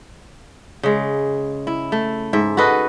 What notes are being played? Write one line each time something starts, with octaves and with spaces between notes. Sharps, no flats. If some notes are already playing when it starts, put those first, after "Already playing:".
C#3 G#3
E4
A3
G#2 E5
F#4 A4 B4 D#5